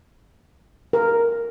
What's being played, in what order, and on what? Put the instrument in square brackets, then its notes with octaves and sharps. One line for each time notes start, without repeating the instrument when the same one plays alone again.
[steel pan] A#4